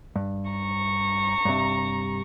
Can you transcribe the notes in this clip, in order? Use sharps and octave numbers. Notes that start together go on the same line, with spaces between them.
G2
A#5 C#6
G2 C3